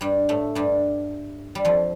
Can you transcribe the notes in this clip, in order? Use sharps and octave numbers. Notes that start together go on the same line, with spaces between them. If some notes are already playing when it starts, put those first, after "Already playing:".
G2 G3
A2 A3
G2 G3
G3
F2 F3